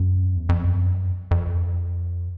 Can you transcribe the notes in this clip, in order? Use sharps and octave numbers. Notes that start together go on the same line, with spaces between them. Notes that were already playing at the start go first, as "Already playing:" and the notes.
Already playing: F#2
E2
F2
F#2
F2